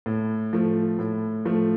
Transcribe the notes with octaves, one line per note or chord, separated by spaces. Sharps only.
A2
F3 A3
A2
F3 A3